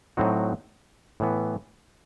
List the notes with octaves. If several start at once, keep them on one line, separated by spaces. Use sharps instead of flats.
A2 F#3 C4 D#4 F#4
A2 E3 B3